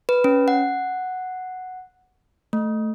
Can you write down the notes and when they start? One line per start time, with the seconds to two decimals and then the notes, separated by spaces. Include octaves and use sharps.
0.09 B4
0.24 C#4
0.48 F#5
2.53 A3